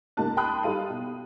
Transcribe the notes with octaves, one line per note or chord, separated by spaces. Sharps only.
C#2 A#3 D#4 G4 A5 F#6
G5 A5 B5 C6 D#6 F#6
G3 D#4 A4 F5 D#7
B2